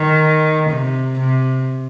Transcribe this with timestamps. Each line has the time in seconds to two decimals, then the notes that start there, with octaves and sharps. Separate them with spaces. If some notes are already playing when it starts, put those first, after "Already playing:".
Already playing: D#3
0.69 C3
1.19 C3